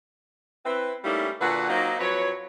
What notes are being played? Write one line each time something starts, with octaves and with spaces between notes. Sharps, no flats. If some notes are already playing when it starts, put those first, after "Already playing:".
C4 E4 B4
G3 A3 A#3 C#4 D#4 E4
A#2 D3 F#4 B4 F#5
F#3 A#3 C4 D#4
F2 F#3 B4 C#5